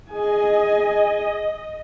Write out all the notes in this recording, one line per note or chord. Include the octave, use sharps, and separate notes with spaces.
G#4 D#5 G#5